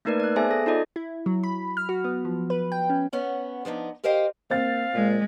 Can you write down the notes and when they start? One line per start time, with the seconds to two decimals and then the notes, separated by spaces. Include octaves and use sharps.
0.05 A3 A#3 D#4 A#4 B4 D5
0.20 D5 F#6
0.36 B3 G#4 C5 E5 G#5 A5
0.51 A4 A#6
0.66 D#4 F4 A4 D5 D#5
0.96 E4
1.26 F#3
1.43 B5
1.77 F6
1.89 F#4
2.04 B3
2.25 F3
2.50 B4
2.72 G5
2.90 C#4
3.13 B3 C#4 F#5
3.65 F3 B3 D4 D#4
4.04 G4 A#4 C5 D#5 F5 G5
4.50 A#3 C4 F5 A6
4.94 A#2 G#3